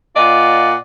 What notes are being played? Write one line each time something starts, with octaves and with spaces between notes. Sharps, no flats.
A#2 F4 D5 D#5 F#5